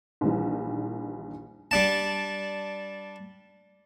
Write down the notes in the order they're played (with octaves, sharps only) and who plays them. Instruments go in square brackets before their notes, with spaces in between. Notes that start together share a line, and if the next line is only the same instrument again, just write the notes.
[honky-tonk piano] A#1 D#3 E3 G3
[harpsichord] G3 D4 A5